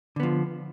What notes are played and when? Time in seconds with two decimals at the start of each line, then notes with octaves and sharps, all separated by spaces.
0.16 D3
0.20 B3
0.23 F3